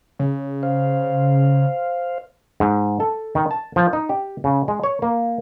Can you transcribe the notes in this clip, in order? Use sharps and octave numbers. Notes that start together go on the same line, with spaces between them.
C#3
C5 F5
G#2
A4
D#3
A5
F3
D#4
G4
C#3
G#3
C#5
A#3